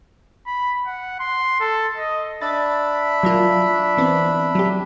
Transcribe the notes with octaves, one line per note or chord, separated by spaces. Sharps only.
B5
F#5
C6
A4
D#5
D4 E5 B5 A6
F#3 A#3 F4
E3 B3 C4
F#3 G4